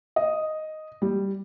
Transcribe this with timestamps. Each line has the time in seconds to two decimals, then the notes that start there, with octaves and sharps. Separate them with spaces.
0.16 D#5
1.02 G3